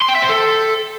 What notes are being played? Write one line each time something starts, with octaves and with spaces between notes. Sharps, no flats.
C6
G5
E5
C5
A4